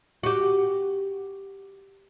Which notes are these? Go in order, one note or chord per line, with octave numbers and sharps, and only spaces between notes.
F#4 G4